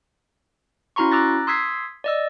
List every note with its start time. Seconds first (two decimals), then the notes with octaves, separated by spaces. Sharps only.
0.96 C#4 E4 F#4 A#5 C6 C#6
1.11 A#5 D6 E6 F#6 A6 A#6
1.47 C6 D#6 E6 G#6 B6 C7
2.04 D5 D#5 E6